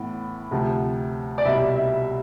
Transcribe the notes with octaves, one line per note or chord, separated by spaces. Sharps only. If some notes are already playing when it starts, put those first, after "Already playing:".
Already playing: A2 E3 B3
D2 C3 F3
D5
C2 B2 G3 E5
E5